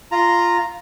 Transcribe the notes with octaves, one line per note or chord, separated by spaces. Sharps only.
F4 A#5